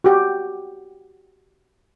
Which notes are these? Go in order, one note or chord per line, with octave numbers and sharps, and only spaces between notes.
F#4 G4